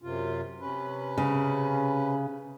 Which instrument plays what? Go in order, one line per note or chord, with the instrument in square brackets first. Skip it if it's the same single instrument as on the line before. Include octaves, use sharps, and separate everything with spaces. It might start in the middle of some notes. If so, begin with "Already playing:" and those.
[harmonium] F#2 C3 F4
C3 C#4 B4
[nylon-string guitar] C#3